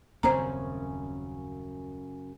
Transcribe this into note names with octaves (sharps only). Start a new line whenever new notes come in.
D#1 F#2 C#3 A#3 C4 C5 A#5